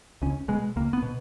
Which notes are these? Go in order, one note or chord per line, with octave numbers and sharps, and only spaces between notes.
C#2 C#4
B2 G#3
C#2 A#3
B3
B2